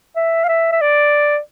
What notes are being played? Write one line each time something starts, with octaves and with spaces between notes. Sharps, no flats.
E5
F5
E5
E5
D5